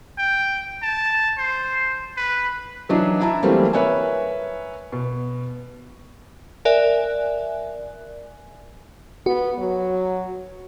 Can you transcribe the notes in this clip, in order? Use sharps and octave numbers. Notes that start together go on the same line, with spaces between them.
G5
A5
C5
B4
E3 F#3 D4 D#4
E4 E5 A5 A#5
E3 F#3 G3 A3 A#3 C4
A#4 B4 C#5 E5 G#5
B2
A#4 D5 E5 G#5 F#6
B3 F#4
F#3